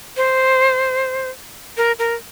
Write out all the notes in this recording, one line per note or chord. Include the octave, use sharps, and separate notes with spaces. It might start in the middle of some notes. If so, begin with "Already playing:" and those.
C5
A#4
A#4